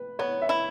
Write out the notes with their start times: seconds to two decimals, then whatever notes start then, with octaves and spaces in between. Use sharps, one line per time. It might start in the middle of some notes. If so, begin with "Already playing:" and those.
Already playing: B4
0.19 B3 C#5
0.42 E5
0.49 E4